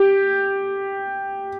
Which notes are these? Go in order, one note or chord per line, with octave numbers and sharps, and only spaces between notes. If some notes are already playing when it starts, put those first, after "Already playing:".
Already playing: G4